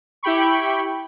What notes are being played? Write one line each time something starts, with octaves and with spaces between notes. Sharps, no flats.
E4 G4 G5 B5 C#6